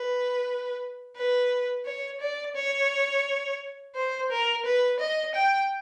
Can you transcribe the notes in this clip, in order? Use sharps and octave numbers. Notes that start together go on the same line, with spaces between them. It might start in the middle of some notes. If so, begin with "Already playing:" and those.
Already playing: B4
B4
C#5
D5
C#5
C5
A#4
B4
D#5
G5